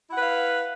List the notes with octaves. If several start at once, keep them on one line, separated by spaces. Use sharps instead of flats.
E4 B4 F5 F#5